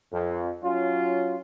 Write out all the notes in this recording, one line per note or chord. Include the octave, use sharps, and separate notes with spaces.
F2
F#3 C#4 F4